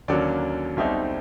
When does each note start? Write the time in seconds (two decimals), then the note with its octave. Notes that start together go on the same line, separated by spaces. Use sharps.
0.08 D#2 D3 F#3 A#3 C#4 D5
0.77 B1 B2 G3 C4 D#4 E5